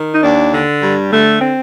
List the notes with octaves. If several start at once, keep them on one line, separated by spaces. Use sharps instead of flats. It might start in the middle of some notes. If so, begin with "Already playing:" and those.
Already playing: D#3
D#4
D#2 D4
D3
G2 G3
D3 A3
C4